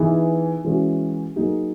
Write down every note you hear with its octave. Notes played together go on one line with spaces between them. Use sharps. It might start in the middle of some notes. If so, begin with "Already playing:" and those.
Already playing: E3 B3 D#4 G#4
E3 G#3 C#4 F#4
F#3 A#3 D#4 G#4